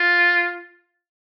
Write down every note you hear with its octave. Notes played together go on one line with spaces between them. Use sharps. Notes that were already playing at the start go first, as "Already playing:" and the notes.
Already playing: F4